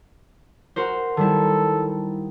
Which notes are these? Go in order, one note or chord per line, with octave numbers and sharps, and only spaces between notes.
F#4 A#4 C5
D#3 G3 E4 A4